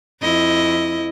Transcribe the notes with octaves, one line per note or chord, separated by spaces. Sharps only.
F2 E4 D#5